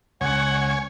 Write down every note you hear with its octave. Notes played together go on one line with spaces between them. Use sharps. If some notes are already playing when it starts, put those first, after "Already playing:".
C#2 C#5 F#5 G#5